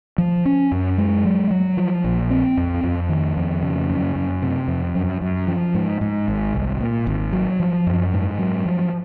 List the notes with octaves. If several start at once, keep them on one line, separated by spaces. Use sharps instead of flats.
F3
C#4
F#2
G#3
F#3
F#3
F3
A#1
C4
F2
F2
D#3
F2
C#3
F#2
F#2
C3
F2
F#2
F#2
F3
G#2
G#2
G#1
C2
A#2
G#1
F#3
F3
F#2
G#2
F#3
F3